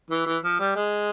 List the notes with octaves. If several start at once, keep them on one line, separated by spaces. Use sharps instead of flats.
E3
E3
F3
G3
G#3